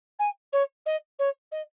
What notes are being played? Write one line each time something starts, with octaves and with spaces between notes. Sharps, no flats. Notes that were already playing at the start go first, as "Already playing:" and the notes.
G#5
C#5
D#5
C#5
D#5